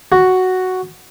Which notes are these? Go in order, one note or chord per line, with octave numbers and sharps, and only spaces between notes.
F#4